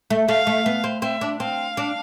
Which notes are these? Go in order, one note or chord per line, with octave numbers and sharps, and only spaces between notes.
A3
A3 F5
A3
B3
C4
C4 E5
D4
C4 F5
D4